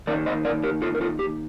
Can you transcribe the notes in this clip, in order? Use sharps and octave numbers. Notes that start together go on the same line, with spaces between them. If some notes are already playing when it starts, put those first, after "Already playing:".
D#3 A#3 D#4 A#4 D5
C5 D#5
A#4 D5
G4 A#4
F4 A4
A#4
F4 A4
G4